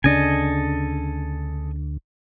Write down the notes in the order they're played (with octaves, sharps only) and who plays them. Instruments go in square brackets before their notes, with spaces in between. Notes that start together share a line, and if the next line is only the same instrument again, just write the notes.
[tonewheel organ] D2 [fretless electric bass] C#3 D4 [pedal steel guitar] A4 D#5 G#5